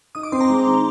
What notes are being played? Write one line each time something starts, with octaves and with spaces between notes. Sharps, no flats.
D#4 D#6
D6
C4 C6
A#5
G#3
D#3